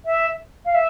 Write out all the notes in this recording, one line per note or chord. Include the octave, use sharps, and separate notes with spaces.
E5
F5
E5